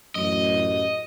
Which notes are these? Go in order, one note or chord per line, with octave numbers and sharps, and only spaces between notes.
A1 F#2 D#5